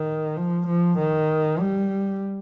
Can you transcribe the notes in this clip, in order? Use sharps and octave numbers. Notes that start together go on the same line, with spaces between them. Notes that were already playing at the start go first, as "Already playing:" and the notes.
Already playing: D#3
F3
F3
D#3
G3